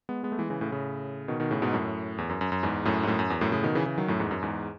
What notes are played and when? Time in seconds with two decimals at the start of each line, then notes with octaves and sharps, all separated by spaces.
0.09 G#3 B3
0.23 G#3 B3
0.32 A3
0.39 E3 G#3
0.50 C#3 E3
0.61 A2 C#3
0.72 A2 C#3
1.28 B2 D#3
1.40 B2 D#3
1.51 A2 C#3
1.62 G#2 B2
1.73 F#2 A2
2.18 E2
2.30 F#2
2.41 F#2
2.52 F#2
2.63 E2 G#2
2.85 F#2 A2
3.03 G#2
3.07 F#2 A2
3.19 F#2
3.30 E2
3.41 F#2 A2
3.52 A2 C#3
3.63 B2 D#3
3.75 C#3 E3
3.86 C#3 E3
3.98 D#3 F#3
4.08 F#2 A2
4.20 E2 G#2
4.31 F#2
4.42 E2 G#2